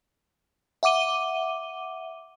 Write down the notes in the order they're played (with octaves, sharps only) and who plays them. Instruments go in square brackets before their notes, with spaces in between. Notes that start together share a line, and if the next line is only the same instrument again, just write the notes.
[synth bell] E5 F#5 D6 D#7 G7